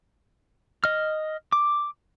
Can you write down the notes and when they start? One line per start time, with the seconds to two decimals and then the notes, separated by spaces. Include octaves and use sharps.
0.84 D#5 F6
1.52 D6